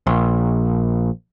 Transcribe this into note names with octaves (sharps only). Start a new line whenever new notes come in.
A#1